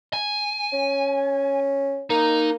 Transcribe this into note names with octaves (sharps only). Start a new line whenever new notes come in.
G#5
C#4
A#3 D#4